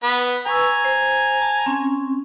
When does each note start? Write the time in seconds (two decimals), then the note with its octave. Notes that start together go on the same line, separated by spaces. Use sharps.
0.03 B3 B4
0.46 B4 G#5 A#5 C#6 E6
0.85 C5
1.42 A5
1.66 C4 C#4